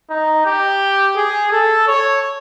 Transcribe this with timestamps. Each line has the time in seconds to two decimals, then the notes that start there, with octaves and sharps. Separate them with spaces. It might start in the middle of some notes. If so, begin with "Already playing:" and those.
0.10 D#4
0.46 G4
1.16 G#4
1.52 A4
1.87 C#5